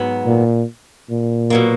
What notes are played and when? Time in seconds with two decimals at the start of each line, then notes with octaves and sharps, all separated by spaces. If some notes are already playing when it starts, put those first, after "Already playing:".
Already playing: G#2 F#3 B3
0.26 A#2
1.10 A#2
1.50 B2 F#3 A#3